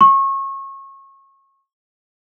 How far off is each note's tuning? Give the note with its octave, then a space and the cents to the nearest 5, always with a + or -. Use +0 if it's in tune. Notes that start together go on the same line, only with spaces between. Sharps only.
C#6 -30